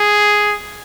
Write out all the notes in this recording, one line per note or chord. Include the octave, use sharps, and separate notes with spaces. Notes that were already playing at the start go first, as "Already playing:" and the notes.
Already playing: G#4